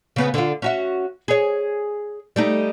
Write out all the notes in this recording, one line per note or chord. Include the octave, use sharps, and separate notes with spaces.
C#3 B3
D3 F4
C#4 F#4 E5
G#4 C#5
G3 A3 D#4